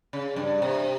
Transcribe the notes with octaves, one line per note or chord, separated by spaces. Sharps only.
C#3
G2
C3